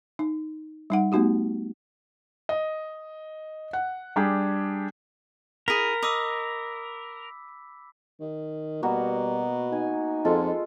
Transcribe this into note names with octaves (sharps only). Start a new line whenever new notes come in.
D#4
G3 D#4 F#5
A3 B3 D#4 F#4 G4
D#5
F#5
G3 D4 G4 G#4
E4 G#4 A#4 B6
D#5 B5 D6 E6
D#3
B2 G3 A#3 B3 F#4
D#4 G#5
F2 G#3 F4 A4